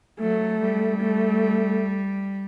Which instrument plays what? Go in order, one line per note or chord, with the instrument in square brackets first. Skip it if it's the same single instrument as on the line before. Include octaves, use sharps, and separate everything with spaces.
[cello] F#3 [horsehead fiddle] A3
[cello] G3
[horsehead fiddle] A3